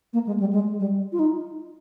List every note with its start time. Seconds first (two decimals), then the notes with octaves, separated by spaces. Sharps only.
0.13 A#3
0.27 G#3
0.40 G3
0.53 G#3
0.79 G3
1.12 F4
1.19 D#4